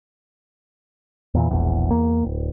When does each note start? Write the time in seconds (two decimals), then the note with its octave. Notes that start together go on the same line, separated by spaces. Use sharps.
1.34 E2 A#2 E3
1.51 E1 A#1 E2
1.91 E2 A#3
2.24 D1